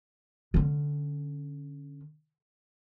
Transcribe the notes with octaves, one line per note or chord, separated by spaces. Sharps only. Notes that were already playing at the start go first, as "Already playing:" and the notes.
D3 C#4